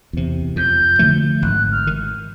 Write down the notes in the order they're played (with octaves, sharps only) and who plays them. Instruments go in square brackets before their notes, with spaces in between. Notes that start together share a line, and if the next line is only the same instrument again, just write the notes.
[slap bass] E2 C3
[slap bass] F2 [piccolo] G6
[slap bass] D3 F3 A3
[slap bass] G#1 [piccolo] F#6
[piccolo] F6
[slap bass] D#3